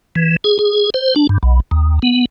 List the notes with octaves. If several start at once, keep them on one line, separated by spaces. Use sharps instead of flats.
E3
G#4
G#4
C5
D4
G2
B1
D#2
B3